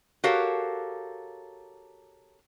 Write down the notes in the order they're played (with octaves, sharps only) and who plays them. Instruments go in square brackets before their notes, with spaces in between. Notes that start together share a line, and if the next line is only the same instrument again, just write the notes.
[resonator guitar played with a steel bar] F#4 G4 A4 A#4 C#5 F5